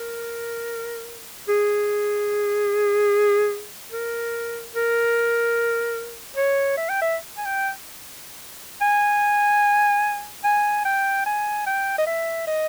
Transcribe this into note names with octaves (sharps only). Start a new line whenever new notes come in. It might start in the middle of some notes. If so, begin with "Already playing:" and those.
Already playing: A#4
G#4
A#4
A#4
C#5
E5
G5
E5
G#5
G5
G#5
G#5
G5
G#5
G5
D#5
E5
D#5